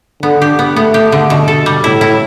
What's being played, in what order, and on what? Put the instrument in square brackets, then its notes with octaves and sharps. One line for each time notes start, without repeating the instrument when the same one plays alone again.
[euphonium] D3 [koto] B3
[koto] G4
B3
[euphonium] A3 [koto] B3
[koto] G4
D3
B2
A4
G3
[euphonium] A2 [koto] E4
[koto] E4